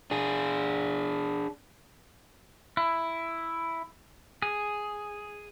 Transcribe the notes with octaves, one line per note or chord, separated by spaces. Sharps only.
D4 G#4
E4
G#4